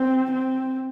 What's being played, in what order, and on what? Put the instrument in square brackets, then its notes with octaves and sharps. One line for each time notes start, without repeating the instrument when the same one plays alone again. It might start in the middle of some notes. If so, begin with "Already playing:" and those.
Already playing: [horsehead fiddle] C4
C4